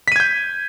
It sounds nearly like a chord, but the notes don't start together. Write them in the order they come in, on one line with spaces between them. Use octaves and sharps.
B6 D#7 G#6 G6